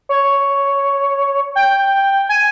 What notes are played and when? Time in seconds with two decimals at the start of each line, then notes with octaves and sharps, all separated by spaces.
0.09 C#5
1.56 G5
2.29 G#5